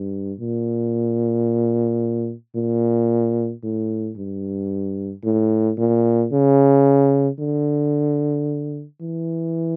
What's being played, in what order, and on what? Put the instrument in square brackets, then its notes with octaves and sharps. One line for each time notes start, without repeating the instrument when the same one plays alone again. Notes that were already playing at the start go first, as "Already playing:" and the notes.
Already playing: [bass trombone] G2
A#2
A#2
A2
G2
A2
A#2
C#3
D3
E3